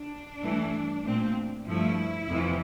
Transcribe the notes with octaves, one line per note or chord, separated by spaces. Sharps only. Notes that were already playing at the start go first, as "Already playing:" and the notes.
Already playing: D4
G2 E3 A3
A#2 A3 C4
G2 F3 A3 E4
F2 C3 E3